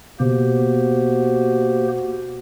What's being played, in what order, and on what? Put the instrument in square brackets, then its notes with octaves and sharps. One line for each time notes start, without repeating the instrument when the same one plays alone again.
[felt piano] B2 [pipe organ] A#3 G4 C5 [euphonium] F#4